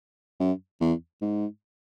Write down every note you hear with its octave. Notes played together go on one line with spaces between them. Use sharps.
F#2
E2
G#2